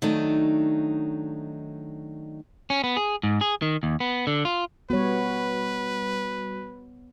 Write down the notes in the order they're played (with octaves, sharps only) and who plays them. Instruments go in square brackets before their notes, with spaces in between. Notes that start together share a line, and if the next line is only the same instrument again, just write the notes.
[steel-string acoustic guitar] D#3 F#3 A3 D4 D#4
[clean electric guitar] C#4
B3
G#4
G#2
G#4
D#3
D#2
B3
D3
F4
[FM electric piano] G3 F#4 [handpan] B3 C#5 [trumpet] B4